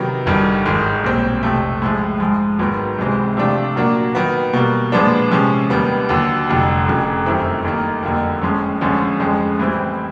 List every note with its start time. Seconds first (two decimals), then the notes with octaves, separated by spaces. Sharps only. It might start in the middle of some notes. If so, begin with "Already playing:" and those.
Already playing: C3 D#3 F#3 B3
0.26 G1 G2 D#3 G3
0.65 G#1 G#2 D#3 G#3
1.04 B1 A#2 G3 C4
1.43 F2 C3 F3 A3
1.82 A2 F3 G#3
2.20 G#2 F3 G#3
2.59 G#1 G#2 D#3 F#3 B3
2.98 C#2 C3 E3 G#3 C4
3.37 C3 F3 A3 D4 F4
3.76 A#2 F#3 A#3 D4 F#4
4.15 D#3 F#3 B3
4.53 B2 G3 A#3
4.92 A#2 F3 G#3 B3 D4
5.31 C3 F3 G#3 C#4
5.70 D#2 D#3 G3 B3
6.09 D#2 D3 F#3
6.48 F1 F2 D3 G3
6.86 F1 F2 C#3
7.26 F#2 D#3 G3 C4 E4
7.65 D#2 D#3 G3 A#3 D#4
8.03 F#1 F2 D3 G3 A#3
8.42 A2 F3 G#3 C#4
8.81 D2 D3 F3 G#3 C#4
9.20 F2 C#3 F3 G#3
9.59 A2 E3 G3 C4